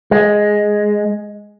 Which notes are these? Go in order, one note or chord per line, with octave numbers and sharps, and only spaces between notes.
G#3